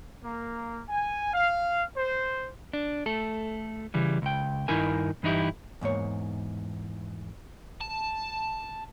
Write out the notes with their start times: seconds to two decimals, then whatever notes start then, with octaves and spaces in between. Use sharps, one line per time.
0.23 A#3
0.89 G#5
1.33 F5
1.97 C5
2.73 D4
3.06 A3 A4
3.94 C#3 E3 G3
4.22 C#2 G5
4.68 G2 D#3 D#4 E4 A#4 G#5
5.23 G2 E3 D#4 E4 G4
5.81 E2 G#2 A#3 C#5
7.81 A5